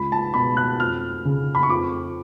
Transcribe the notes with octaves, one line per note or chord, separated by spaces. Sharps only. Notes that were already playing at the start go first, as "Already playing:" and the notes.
Already playing: C#2 B5
A5
B2 B5
F#6
F2 F6
C#3
B5
C#6
F2 D6